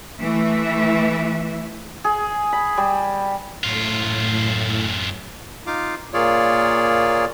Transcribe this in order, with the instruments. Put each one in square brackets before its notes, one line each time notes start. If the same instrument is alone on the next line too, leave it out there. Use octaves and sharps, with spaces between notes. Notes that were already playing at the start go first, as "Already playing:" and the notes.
[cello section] E3 A3 B4 E5
[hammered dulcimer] G#4
B5
G3
[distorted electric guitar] F#2 F4 [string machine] A2
[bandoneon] D#4 F4 F5 D6
A#2 A#3 F4 G#4 C#5 D5